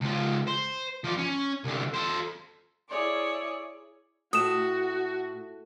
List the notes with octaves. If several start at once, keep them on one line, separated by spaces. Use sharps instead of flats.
C#2 F3
C5
F3 D5
C#4
C2 D3
A4 C5
E4 G#4 C#5 D5
A2 F#4 D#6 E7